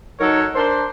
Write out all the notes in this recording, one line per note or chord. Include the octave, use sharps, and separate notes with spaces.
F#3 D#4 A4 A#4 C#5
D4 A#4 C5